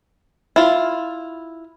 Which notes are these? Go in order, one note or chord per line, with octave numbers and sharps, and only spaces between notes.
E4 F4